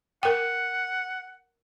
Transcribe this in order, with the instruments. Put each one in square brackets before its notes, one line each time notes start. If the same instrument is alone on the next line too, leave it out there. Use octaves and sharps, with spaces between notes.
[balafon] A#4 G5 [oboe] F#5